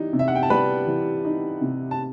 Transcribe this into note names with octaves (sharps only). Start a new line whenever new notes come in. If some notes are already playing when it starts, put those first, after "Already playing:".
Already playing: E3 G3 D#4
C3
E5
F#5
G5
A5
G3 B4 B5
E3
D#4
C3
A5